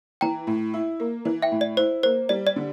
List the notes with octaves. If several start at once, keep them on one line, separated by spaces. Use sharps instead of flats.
E3 G5 A#5
A2
E4
A#3
E3
E5 G5
A2
D5
E4 C5
A#3 C5
G3 D5
D5
D3